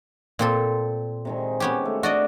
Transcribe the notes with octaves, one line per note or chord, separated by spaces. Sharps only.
A#2 C4 A4
C3 D#3 G#3
B3 C#4 G4
A3
D4 F#4 D5 D#5